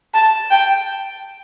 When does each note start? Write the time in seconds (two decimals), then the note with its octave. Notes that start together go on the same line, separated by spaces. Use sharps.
0.14 A5
0.51 G5